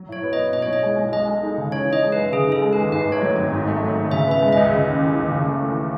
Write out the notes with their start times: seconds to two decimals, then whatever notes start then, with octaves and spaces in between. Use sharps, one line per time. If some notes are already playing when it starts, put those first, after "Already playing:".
Already playing: F#3
0.09 A2 C#5
0.23 B3
0.33 D#5
0.38 A2
0.53 B2 D#5
0.62 C#5
0.68 B1
0.73 D#5
0.83 G#3
0.98 B1
1.12 G#3 D#5
1.28 A4
1.43 D#4
1.58 C#3
1.72 E3 C#5
1.88 D#4 D#5
2.03 G#3
2.12 F#2 B4
2.32 C#3 G#4
2.47 D#4
2.52 A4
2.62 G#3
2.73 D#2 B4
2.92 G#2 B4
3.07 A3
3.12 C#5
3.22 F#3
3.38 G#1
3.52 G#2
3.67 A3
3.82 F#3
3.98 G#1
4.11 C#3 E5
4.28 B3 E5
4.42 G#3
4.52 C#2 D#5
4.71 C#3
4.87 D#2
5.02 E3
5.16 D#2
5.32 C#3
5.46 A3
5.61 E3